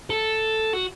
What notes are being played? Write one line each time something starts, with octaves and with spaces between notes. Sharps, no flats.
A4
F#4